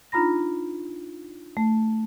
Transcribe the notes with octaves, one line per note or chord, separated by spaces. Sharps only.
D4 D#4 F4 A#5 B5 A#6
A3